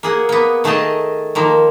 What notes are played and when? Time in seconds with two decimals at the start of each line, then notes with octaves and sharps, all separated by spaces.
0.03 A#3 G#4 F#5
0.29 A#3 B3
0.64 D#3 A3 G#4 A#4 D#5 A5
1.35 D#3 F3 A#3